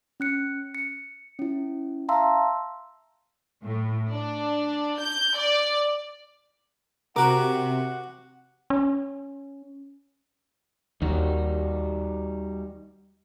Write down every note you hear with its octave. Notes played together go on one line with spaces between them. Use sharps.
C#4 F#6 C#7
C#7
C#4 E4
E5 F5 A5 A#5 C6 E6
A2
D4
G6
D5
C3 F#4 A#4 F#5 D6
C#4
D#2 G3 D#4 F#4